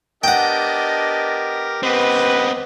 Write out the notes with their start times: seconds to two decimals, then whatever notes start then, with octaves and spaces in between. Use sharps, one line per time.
0.24 B3 D4 G4 A#4 D#5 F#5 G5
1.83 B3 C4 G4 B4 D#5